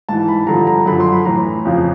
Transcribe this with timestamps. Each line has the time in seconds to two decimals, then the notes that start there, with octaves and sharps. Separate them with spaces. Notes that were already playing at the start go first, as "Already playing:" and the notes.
0.09 G#2 E3 A5
0.28 B5
0.47 G2 D3 F3 A#5
0.67 A#5
0.86 F#2 D3 F3 B5
1.00 C6
1.13 B5
1.25 A2 E3 A#5
1.65 F2 C#3 F3